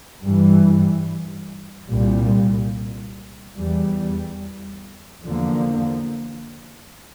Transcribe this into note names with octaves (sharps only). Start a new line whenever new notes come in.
G2 E3 G3
C2 A#2 G3
E2 E3 G3
E2 D3 F3 A#3